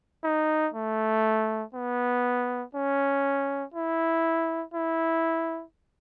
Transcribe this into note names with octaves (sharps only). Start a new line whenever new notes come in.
D#4
A3
B3
C#4
E4
E4